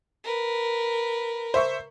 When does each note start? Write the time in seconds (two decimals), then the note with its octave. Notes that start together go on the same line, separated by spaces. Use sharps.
0.24 A#4 B4
1.54 C5 E5 C#6